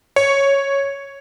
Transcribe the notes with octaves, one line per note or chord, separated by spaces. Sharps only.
C#5